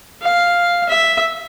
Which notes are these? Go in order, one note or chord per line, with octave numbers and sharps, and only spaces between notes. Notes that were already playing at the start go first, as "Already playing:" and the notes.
F5
E5